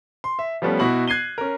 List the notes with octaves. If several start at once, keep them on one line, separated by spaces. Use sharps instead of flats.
C6
E5
F3 G3 A3 B3 C#4
B2 E4 F#4 B5 F#7
F#6 G#6 C7 D#7 G7
C#4 A#4